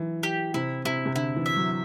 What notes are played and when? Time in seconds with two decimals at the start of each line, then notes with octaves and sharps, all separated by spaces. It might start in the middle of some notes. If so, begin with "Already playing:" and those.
Already playing: E3 F#3
0.23 G4
0.54 C3 E4
0.85 C3 E4
1.06 C3
1.15 D3 E4
1.36 E3
1.46 E5
1.56 F#3